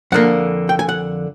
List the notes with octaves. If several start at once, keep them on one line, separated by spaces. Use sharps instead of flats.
F2 D3 F3 A#3 F#5
G5
G#5
F#5